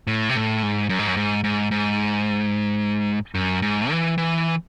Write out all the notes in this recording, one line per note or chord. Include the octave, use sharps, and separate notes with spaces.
A2
C3
A2
G#2
F#2
G#2
F#2
G#2
G#2
G#2
F#2
G#2
E3
E3